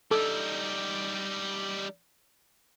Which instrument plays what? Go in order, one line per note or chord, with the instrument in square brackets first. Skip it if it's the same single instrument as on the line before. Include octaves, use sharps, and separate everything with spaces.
[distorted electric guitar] G3 D#4 [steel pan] A4